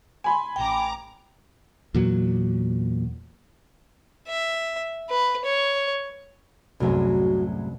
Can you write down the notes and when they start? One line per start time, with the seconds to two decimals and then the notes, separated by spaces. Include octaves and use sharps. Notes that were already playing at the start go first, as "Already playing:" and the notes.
0.24 G#5 B5 C6
0.56 A1 G5 A#5 D6
1.94 E2 A#2 F#3
4.28 E5
5.09 B4
5.45 C#5
6.80 C2 F#2 A2 F#3 G#3 F#4